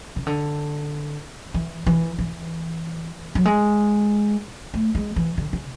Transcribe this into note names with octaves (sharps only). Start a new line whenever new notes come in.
C#3
D3
E3
E3
E3
F#3
G#3
A3
G#3
E3
D3
C#3